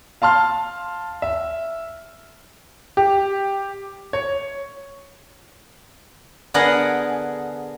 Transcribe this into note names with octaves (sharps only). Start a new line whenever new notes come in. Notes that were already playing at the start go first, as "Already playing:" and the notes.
F5 A5 C6 F6
E5
G4
C#5
D3 B3 G#4 A#4 D#5 F#5